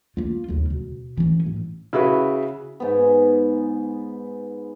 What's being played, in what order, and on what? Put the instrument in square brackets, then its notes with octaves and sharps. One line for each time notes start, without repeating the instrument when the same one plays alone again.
[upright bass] A#3 F4
D#2 C#3
B2
E3 C#4
A2
[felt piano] C#3 E4 F#4 B4
[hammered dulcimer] G#2 B3